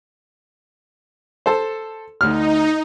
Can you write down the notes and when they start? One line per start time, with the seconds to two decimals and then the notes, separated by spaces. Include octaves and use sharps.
1.46 A4 C5
2.21 D2 D#4 F6